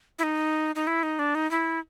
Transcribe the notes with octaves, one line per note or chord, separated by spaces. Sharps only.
E4
D#4
D#4
E4
D#4
D4
D#4
E4